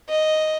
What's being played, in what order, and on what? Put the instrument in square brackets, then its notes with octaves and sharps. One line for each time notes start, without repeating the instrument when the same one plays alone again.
[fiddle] D#5